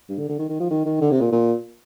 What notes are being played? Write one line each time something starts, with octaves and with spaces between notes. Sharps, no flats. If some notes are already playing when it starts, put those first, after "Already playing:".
G2
D3
D3
D#3
D#3
F3
D#3
D#3
D3
C3
A#2
A#2